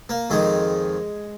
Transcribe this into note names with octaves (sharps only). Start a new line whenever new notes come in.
A#3
F2 D#3 G#3